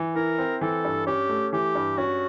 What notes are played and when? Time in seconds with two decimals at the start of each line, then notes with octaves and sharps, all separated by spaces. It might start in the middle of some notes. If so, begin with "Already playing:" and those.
Already playing: E3
0.15 E4 A#4
0.38 C4
0.61 E3 A4
0.85 G2
1.07 C#4 G4
1.29 A3
1.53 E3 G4
1.75 G2
1.98 C#4 F#4